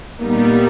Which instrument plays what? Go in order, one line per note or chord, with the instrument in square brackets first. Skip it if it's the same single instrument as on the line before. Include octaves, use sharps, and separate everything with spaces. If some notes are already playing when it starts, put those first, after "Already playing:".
[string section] A#2 G3 B3 D#4 [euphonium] A#3